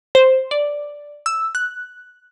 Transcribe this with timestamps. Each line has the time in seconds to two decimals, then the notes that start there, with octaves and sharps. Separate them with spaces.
0.15 C5
0.51 D5
1.26 E6
1.55 F#6